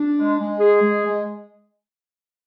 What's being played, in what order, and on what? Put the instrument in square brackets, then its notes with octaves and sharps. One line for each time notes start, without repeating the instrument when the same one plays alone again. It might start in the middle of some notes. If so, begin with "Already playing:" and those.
Already playing: [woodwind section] D4
G#3
G#3
G#4
G#3
G#3